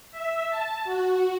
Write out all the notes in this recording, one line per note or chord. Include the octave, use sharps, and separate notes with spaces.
E5
A5
F#4